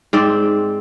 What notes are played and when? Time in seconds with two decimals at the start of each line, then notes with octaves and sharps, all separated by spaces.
0.13 G#2 C4 D5